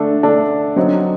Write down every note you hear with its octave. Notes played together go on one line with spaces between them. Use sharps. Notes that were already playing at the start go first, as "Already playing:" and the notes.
Already playing: D3 A3 D4 A4
D3 A3 D4 A4
D3 F#3 C4 D#4